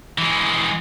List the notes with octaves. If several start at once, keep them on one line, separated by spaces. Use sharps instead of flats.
E3 G#3